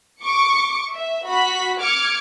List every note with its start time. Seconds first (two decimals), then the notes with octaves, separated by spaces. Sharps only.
0.22 C#6 D6 C#7
0.91 E5
1.26 F#4 B5 B6
1.80 D6 F6 G#6 C#7